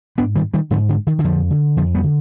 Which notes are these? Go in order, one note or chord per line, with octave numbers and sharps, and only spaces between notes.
G#2 B3 D4
D#3 G3
D#3 G3
G#2 D3 F3
D3
D#3
D#3
F2 D3 F3
D3
F2 D3 F3
G3 B3
D3